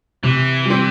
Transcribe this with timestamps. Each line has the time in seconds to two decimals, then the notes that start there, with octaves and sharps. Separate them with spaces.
0.23 C3 E3
0.65 G3 C4